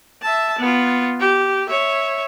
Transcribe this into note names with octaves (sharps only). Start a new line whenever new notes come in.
E5 A5
B3 F4
G4
C#5 E5